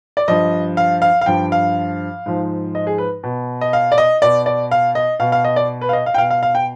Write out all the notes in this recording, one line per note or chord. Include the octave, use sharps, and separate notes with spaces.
D5
G2 F3 D#5
F5
F5
F5
G2 F3 G5
F5
G#2 F3
D#5
G#4
B4
B2
D#5
F5
D5
D#5
B2 D5
D5
F5
D#5
B2 F5
F5
D#5
D5
B4
F5
D#5
F5
G5
B2 F5
F5
F5
G5